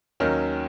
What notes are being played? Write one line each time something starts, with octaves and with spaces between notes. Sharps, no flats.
D#2 D#3 F#3 C#4